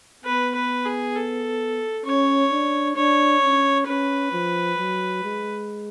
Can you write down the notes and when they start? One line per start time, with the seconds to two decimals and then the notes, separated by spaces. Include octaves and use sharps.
0.24 B3 B4
0.55 B4
0.85 G#4
1.15 A4
2.06 C#4 C#5
2.51 D4
2.96 D4 C#5
3.42 C#4
3.87 C#4 B4
4.32 F3
4.78 F#3
5.23 G#3